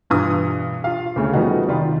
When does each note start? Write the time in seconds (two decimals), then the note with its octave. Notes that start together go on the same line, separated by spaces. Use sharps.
0.10 E1 G2 E3 F4 D#6
0.84 F4 F5
1.16 D2 C#3 A3
1.33 F3 G3 A3 B3 D#4 F#4
1.68 F1 D#3 F4 B5